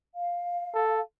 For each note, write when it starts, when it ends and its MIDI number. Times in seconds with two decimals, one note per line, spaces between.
0.16 1.01 77
0.74 1.01 69